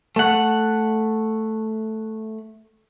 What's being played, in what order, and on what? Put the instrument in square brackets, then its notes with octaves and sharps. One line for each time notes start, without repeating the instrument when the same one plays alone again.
[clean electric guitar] A3 F#5